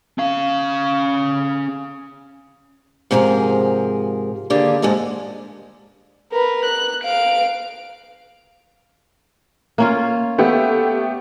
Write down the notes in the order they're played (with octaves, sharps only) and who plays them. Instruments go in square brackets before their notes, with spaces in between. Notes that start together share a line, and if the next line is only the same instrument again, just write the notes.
[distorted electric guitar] C#4 F5
[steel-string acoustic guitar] G#2 C3 F3 G#4 A#4
D3 D#3 A#3 D4 G4 G#4
G#2 G#3 A4 D#5
[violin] A#4 B4
F#6
F5 D7
[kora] A#3 C#4 F4
[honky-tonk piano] A3 B3 G4